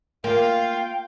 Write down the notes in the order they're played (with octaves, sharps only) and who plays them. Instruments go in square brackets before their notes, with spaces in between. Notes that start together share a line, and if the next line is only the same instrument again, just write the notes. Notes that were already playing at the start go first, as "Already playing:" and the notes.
[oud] A#3 [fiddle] F4 [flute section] F5 [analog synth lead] G5